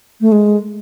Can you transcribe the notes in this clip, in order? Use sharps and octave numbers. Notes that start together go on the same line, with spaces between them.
A3
G#3